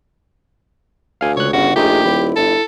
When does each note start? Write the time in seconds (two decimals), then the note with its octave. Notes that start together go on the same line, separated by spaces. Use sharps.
1.21 D2 F5 G#5
1.37 C#2 C#5 F#6
1.53 G1 C#3 F#4
1.76 A#1 A3 D#4 G4 G#4
2.05 D#1 E4
2.36 G1 A4